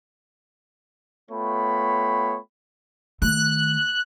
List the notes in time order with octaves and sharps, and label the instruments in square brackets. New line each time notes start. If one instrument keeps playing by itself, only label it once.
[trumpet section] A3 B3 F4 C#5 G5 B5
[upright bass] D#3 A3 [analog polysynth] F#6